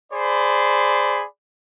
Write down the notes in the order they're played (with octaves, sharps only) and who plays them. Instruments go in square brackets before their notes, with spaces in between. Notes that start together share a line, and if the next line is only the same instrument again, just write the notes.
[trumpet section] G#4 C5 D5 B5